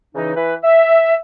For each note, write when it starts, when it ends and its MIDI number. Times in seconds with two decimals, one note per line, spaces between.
0.15 0.32 49
0.15 0.32 52
0.15 0.32 63
0.36 0.54 52
0.36 0.54 71
0.63 1.16 76